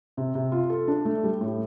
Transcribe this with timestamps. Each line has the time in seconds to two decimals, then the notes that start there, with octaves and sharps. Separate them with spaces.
0.17 C3
0.35 C3
0.52 F4
0.70 A4
0.88 D4
1.05 A3
1.24 G3
1.41 A2